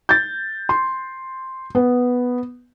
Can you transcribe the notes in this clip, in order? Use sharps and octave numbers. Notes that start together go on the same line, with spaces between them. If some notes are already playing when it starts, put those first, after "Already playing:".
G6 A6
C6
B3